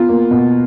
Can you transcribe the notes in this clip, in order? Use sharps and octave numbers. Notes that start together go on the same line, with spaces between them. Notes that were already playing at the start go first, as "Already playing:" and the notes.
Already playing: B3 F4
A#3
B2